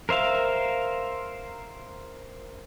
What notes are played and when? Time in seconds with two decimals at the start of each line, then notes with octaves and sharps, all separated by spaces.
0.09 A#4 C5 E5 F5